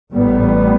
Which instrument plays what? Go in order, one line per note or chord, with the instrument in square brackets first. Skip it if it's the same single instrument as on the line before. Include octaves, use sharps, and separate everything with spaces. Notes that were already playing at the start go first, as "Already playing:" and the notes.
[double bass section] A1 A2 G3 B3